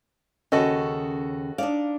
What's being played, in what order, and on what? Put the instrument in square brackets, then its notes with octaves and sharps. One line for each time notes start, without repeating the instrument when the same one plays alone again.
[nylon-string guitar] D#2 C#3 [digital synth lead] C#4 [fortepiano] F#4 A4 D#5
[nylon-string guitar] D4 D#4 D5 [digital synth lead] F5